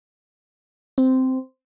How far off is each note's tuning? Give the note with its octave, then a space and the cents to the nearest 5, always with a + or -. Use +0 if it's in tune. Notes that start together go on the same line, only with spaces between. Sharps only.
C4 -10